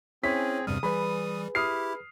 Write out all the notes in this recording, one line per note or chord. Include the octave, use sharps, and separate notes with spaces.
C4 C#4 E4 G#4 C#5 B6
E2 G2 C3 G3 D#6 F6
E3 G3 G#4 B4 B5
E4 G4 D#6 F6 C7